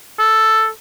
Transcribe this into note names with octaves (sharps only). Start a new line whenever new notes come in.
A4